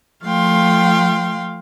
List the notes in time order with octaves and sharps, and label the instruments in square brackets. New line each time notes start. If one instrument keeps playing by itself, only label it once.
[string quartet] F3 A3 F5 G5 C6